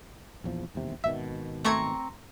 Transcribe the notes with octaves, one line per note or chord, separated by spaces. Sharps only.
A#1 E2 F3
E1 D#2 C3
G#1 B2 D#3 E5
A3 C4 A#5 C#6 G#6